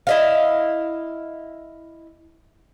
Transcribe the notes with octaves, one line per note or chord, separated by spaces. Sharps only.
E4 D#5 F5